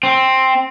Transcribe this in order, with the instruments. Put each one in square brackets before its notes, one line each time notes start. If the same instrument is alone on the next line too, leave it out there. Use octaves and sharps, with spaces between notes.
[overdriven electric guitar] C4